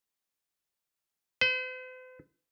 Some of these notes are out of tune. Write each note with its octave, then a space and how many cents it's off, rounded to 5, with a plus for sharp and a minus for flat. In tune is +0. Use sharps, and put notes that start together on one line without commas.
C5 -45